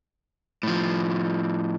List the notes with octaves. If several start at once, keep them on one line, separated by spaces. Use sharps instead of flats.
A2 F3